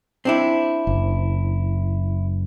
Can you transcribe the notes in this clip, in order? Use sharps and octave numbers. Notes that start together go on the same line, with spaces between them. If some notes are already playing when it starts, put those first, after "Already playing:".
C4 D4 E4
F#1